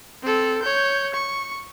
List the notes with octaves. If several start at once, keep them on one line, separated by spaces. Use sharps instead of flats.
C4 A4
C#5 G6
C#6